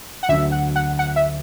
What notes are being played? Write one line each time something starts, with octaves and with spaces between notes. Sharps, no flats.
F#5
D2 D3 F#3 E5
F#5
F#5
F#5
E5